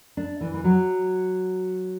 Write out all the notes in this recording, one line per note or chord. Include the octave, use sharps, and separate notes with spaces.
D4
E3
E3
F#3